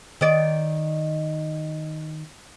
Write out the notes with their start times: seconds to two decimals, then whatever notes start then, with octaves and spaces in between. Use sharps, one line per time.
0.21 D#3 D5